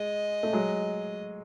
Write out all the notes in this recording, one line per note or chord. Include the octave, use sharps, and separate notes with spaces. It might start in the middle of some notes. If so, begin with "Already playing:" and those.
Already playing: G#3 D#5
A3
F#3 G#3